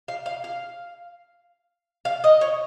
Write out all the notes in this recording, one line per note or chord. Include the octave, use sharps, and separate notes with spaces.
F5
F5
F5
F5
D#5
C#5